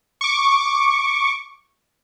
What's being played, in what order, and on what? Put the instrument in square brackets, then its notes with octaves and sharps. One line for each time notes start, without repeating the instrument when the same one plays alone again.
[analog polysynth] C#6 D6